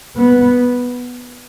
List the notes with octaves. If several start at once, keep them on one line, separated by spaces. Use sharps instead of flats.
B3